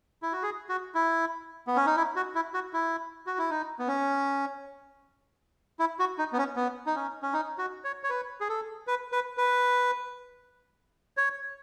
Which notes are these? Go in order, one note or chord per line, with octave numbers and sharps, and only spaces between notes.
E4
F#4
G#4
F#4
E4
B3
C#4
D#4
E4
F#4
E4
F#4
E4
F#4
E4
D#4
B3
C#4
E4
F#4
D#4
B3
C#4
B3
D#4
C#4
C#4
D#4
F#4
C#5
C#5
B4
G#4
A4
B4
B4
B4
C#5